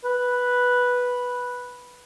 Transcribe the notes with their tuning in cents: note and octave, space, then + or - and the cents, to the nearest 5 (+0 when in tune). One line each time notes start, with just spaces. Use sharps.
B4 -5